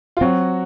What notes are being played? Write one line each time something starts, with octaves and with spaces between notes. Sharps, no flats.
F4
F#3 C4 F#4